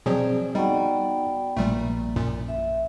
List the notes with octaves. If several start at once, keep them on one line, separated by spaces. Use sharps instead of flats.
B2 F3 F#3 C4 G#4 D5
G3 B3 D#4 F#4 D5 G5
A#1 A#2 G3 A3 A#3
F#2 A#2
E5